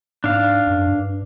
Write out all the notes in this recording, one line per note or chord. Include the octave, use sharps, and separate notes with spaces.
G#2 D4 F5
F#2
G2